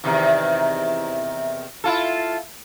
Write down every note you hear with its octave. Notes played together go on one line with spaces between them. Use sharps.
E2 C3 D#3
E4 F4 A4